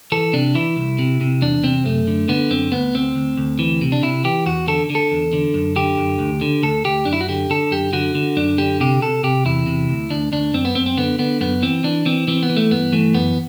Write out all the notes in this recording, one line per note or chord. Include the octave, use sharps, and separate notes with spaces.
E3 A4
C3 D4
E3 E4
C2
C3
C3
E2 D4
C3 C4
F#2 A3
D3
D3 B3
F#2 C4
D2 B3
D2 C4
D2
D2
E3
C3
D4
C3 E4
E3 G4
E2 F#4
D3 A4
D3
A4
E2
D3
F#2
D3 G4
F#2
D2
D3
D2 A4
D2 G4
F#2 D4
E4
F#4
D3 G4
D3 A4
F#2 G4
D3 F#4
D3
F#2 D4
D3 G4
C3 G4
C3 A4
C3 G4
E2 E4
C3
D2
D2 D4
D2 D4
F#2 C4
B3
F#2 C4
C4
D3 B3
D3 B3
F#2 B3
E3 C4
E3 D4
E3 C4
E3 C4
B3
E3
A3
G2 B3
E3 A3
F#2 B3